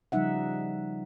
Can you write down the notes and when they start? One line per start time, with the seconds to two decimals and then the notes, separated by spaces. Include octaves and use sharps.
0.12 C#3 F3 G3 D#4 E5 F#5